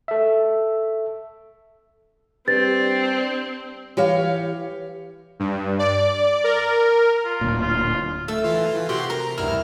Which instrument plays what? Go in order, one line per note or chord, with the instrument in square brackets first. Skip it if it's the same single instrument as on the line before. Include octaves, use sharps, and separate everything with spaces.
[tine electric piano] A4 E5
[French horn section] G3 D4 G4 [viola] C4 [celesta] B4 A6
[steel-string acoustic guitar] E3 G4 C#5 F5
[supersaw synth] G2
D5
A#4
[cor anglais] F4
[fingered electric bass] D1 A#2
[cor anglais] F4
[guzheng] A3 [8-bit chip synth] E6
[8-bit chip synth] E3 F4
[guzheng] C3 [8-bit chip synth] F#4 G4 C6
[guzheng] A#4 [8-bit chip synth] A#5
[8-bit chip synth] D2 G2 F6 [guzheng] E4